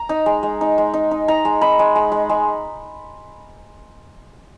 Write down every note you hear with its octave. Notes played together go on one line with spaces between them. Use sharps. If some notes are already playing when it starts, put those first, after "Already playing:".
Already playing: A#5
D#4
G#3
G#3
D#4
G#3
D#4
D#4
D#4 A#5
G#3
D#4 B5
G#3
G#3
G#3
G#3